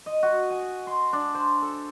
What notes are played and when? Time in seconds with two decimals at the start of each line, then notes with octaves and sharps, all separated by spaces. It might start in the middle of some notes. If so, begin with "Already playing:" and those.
0.06 D#5
0.23 F#4
0.50 G#5
0.87 C6
1.13 D4
1.35 C5
1.62 A4